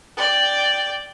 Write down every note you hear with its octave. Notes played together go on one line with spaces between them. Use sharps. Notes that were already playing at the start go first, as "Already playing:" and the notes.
D5 G5